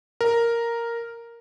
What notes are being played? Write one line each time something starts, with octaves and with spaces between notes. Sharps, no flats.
A#4